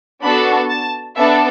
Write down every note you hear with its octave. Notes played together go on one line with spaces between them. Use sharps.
B3 D4 F#4 A4 B5
A5
B3 D4 A4 E5